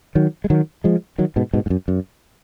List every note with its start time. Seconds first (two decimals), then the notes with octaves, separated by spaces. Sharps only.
0.15 D#3 F#3
0.44 G#3
0.50 D#3 F#3
0.84 F3 G#3
1.18 D#3 F#3
1.36 G#2 B2
1.53 G#2 B2
1.66 G#2
1.70 F#2
1.88 F#2